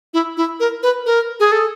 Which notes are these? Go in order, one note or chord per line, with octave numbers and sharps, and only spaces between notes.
E4
E4
A#4
B4
A#4
G#4
A4